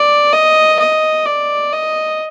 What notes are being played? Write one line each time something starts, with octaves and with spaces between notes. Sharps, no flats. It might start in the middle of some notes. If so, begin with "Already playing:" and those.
Already playing: D5
D#5
D#5
D5
D#5